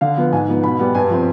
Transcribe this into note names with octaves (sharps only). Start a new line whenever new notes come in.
D3 F5
F3 B3
G#2 G#5
F3 B3
B2 B5
G3 B3
G2 G#5
F3 C4